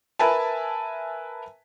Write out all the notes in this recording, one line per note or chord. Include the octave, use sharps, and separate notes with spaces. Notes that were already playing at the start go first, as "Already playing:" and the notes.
A#4 B4 E5 G#5 A5